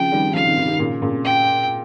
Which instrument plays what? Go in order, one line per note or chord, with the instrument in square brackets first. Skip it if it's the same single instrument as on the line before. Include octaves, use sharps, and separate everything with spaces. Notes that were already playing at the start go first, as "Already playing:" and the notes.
Already playing: [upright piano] C#3 F3 [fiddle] G5
[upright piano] D#3 G3
D#3
[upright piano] C#3 F3 [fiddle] F5
[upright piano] C3 D#3
C3 D#3
C3 D#3
A#2 C#3
A#2 C#3
[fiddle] G5